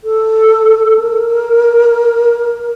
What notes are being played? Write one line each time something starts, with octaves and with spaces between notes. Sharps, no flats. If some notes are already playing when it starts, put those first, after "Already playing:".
A4
A#4